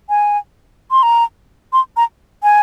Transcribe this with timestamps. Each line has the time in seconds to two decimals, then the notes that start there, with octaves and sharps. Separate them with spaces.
0.09 G#5
0.91 C6
1.03 A#5
1.73 C6
1.97 A#5
2.43 G#5